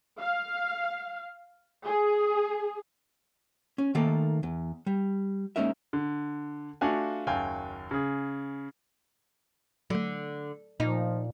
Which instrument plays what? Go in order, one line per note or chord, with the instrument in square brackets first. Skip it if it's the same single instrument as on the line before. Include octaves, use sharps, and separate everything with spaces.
[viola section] F5
G#4
[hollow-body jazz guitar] C#4
D#3 A3 A#3 A4
E2
G3
G#3 A#3 C#4 D#4 A#4 E5
[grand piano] D3
A3 D4 F4 F#4 F5 G#5
F#1 D#2 F#3 F5 G5 G#5
C#3 G#4
[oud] D3 [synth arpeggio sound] F#3 A3
[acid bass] A#2 [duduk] F3 [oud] D#4